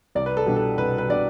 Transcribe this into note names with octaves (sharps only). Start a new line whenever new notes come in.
C2 D5
B4
A4
B2 G3 D4
A4
C2 B4
B4
B2 G3 D4 D5